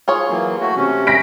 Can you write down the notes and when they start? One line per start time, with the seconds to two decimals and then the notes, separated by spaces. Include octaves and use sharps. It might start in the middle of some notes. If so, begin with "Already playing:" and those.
0.08 F4 G#4 C#5
0.29 E3 F#3 A#3
0.61 A3 F#4
0.77 C3 C#4
1.07 A#6 B6 D7